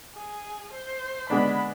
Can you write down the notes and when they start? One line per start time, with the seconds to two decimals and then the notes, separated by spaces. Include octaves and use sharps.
0.15 G#4
0.73 C5
1.29 G#3 B3 D4 B5